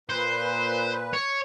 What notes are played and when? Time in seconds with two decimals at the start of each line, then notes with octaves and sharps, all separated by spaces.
0.10 A#2 B4 C5
1.13 C#5